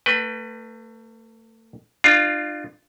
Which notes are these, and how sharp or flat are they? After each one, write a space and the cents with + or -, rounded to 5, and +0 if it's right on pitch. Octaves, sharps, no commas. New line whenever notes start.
A3 +35 B4 +0 G5 +5
D4 +40 F4 +0 F5 +0